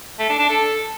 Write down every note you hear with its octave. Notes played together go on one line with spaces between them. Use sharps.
A3
D4
D4
A4